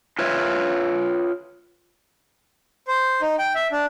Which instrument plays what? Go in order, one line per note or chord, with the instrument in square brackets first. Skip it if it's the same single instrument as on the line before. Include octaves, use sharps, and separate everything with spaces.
[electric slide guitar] F4 B4 C#5 E5
[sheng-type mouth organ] C5
D#4
G5
E5
D4